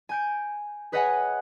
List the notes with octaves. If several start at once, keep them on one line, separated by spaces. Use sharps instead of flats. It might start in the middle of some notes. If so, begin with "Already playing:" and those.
G#5 G6 D7
G#4 B4 C#5 D#5 F#5 G#5